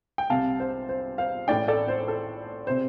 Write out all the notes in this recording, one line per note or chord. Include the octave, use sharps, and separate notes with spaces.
G5
C2 C3 F5 A5
C5
C5
C5 F5
A1 A2 D5 G5
A4 D5
C5
A4
C3 C5